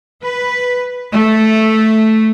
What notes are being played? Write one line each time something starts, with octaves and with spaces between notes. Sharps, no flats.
B4
A3